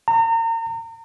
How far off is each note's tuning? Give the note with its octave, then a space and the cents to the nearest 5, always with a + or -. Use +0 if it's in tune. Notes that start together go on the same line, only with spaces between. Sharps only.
A#5 -35